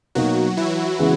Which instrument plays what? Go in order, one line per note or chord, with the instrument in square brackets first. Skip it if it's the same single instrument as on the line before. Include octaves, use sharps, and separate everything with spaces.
[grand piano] B2 A#3 D#4 [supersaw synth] F#3 F#4
[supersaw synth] E3 E4
[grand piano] C#3 E3 G#3 B3